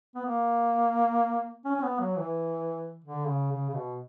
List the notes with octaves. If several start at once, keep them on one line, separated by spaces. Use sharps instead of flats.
B3
A#3
C#4
C#4
B3
F#3
E3
D3
C#3
C#3
C#3
B2